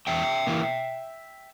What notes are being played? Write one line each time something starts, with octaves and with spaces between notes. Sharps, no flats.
E2 E5 G5
E3 A#3